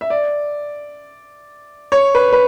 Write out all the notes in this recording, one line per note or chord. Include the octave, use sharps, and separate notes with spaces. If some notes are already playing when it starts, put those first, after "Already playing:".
E5
D5
C#5
B4
B4